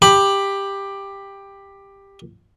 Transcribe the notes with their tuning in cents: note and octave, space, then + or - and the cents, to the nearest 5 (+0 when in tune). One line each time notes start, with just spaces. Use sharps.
G4 +10 B5 +0